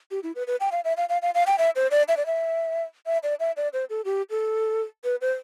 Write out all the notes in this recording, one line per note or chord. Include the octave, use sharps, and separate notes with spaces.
G4
E4
B4
B4
G5
F5
E5
F5
F5
F5
F5
G5
E5
C5
D5
E5
D5
E5
E5
D5
E5
D5
C5
A4
G4
A4
B4
C5